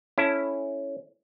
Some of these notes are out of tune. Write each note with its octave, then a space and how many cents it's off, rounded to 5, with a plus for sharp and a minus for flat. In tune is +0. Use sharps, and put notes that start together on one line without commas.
C#4 +0 E4 +0 A4 +0